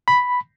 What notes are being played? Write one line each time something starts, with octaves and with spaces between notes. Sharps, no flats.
B5